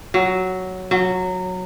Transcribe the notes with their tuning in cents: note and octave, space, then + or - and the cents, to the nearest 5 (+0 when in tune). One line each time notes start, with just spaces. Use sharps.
F#3 +5
F#3 -10